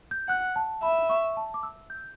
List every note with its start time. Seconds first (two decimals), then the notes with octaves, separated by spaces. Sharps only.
0.11 G6
0.28 F#5 F#6
0.56 A5
0.83 E5 B5
1.09 C#6
1.37 A5
1.54 D6
1.63 E6
1.90 G6